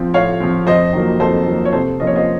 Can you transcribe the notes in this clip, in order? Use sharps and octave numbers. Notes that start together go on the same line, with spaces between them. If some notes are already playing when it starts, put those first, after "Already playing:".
Already playing: F3 C4
A2 C#5 F5
F3 C4
F2 C5 D#5
D#3 F#3 A#3
F2 A4 C5
D#3 F#3 A#3
C#5
C3 A4 C5
F3 A#3 C#4 D#5
C#5
C5 D#5